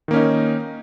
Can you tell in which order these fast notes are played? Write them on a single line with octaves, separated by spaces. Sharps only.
D#3 A#3 C#4 D#4